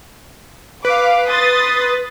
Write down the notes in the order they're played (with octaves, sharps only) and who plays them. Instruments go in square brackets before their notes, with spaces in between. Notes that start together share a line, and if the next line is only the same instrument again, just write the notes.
[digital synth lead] B4 [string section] F5 D6
[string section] C6 D#6 A6